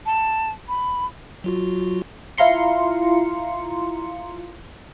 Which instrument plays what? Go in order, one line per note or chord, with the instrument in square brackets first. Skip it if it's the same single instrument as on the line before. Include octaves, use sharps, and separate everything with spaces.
[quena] A5
B5
[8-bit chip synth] F#3 F4 F#4
[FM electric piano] E4 F4 F5 A#5 C6 C#7